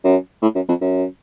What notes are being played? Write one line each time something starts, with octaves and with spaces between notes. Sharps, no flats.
F#2
A2
F#2
F2
F#2